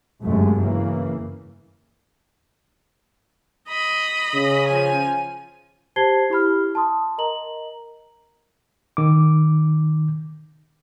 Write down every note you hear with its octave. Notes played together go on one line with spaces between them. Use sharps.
G1 F#2 C3 G#3 A3
C#3 E3 A#3
D#5 B5
C#3
F3 G#5
G4 C5 A5 G#6 C7 G7
E4 G4 B5 F6
A5 C6 D#6
A#4 D#5 A#5 F#7
D#3 D6